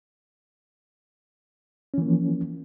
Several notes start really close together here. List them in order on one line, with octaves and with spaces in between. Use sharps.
C#4 E3 A#3 F3